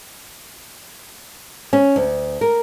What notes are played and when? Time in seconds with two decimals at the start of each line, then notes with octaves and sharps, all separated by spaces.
1.73 C#4
1.96 D2
2.41 A#4